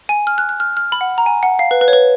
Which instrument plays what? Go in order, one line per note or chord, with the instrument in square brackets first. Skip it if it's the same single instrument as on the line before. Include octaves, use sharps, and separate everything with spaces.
[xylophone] G#5
F6
F#6
F#6
F6
F6
B5
F#5
A#5
G#5
F#5
F5
B4
B4
C#5
B4